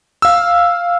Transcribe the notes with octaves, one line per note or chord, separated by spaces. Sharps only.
F5 E6